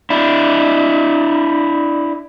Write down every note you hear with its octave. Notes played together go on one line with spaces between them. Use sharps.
D4 E4